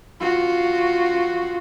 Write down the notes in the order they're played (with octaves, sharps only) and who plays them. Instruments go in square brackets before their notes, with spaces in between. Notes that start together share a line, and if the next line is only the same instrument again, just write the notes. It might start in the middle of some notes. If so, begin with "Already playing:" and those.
[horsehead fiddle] F4 F#4